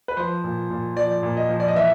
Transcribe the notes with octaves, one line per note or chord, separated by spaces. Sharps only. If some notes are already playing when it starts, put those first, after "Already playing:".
B4
F3 C5
A#2
A#2
F3 D5
A#2
D#5
F3
D5
D#5
E3 E5